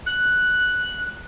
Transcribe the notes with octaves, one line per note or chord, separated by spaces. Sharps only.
F#6